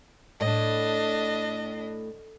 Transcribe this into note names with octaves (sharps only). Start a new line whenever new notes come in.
A2 D4 D#5